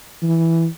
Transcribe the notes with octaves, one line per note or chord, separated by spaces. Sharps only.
E3